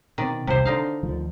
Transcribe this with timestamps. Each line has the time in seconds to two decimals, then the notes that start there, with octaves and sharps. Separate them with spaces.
0.18 B2 D#3 C4 D5
0.47 E1 C2 C3 F3 C5
0.65 D3 D4 D#4 F5
1.03 D2 D#3 F3